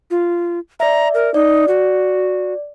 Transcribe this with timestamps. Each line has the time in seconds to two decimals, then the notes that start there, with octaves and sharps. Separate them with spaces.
0.11 F4
0.80 D5 E5 A#5
1.14 A#4
1.34 D#4 D5
1.68 F#4